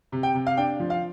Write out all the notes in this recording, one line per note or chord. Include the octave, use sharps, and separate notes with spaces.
C3
G5
C3
F5
D4 G5
F3
F5